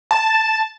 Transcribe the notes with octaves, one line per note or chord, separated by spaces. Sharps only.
A5